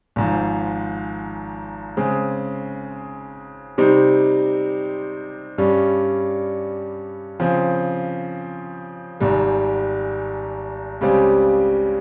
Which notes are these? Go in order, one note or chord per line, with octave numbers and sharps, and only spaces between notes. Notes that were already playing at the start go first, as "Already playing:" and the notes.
G#1 G#2 F3
C#3 G#3 C4
C3 G3 C4 D#4
G2 G3 C#4
C#3 F3 C4
G#1 G#2 G3
C#2 C#3 G3 C4 G4